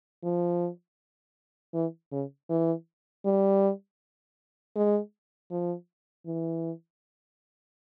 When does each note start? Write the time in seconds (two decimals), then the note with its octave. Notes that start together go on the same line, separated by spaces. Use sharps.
0.24 F3
1.74 E3
2.12 C#3
2.50 E3
3.25 G3
4.76 G#3
5.51 F3
6.26 E3